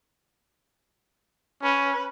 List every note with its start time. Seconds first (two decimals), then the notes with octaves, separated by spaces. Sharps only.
1.63 C#4 B4